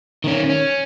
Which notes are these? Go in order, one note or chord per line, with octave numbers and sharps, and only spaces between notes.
D#3 C#4
C#4